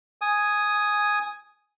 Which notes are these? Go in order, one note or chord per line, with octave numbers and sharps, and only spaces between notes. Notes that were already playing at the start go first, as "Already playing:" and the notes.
G#5 D#6